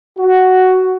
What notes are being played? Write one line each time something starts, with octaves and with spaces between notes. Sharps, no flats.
F#4